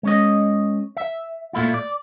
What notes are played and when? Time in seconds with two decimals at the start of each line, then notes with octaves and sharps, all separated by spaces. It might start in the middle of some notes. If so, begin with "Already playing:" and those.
0.03 G#3 C#4 D#5
0.97 E5
1.53 A#2 A3 E4 F4
1.74 D5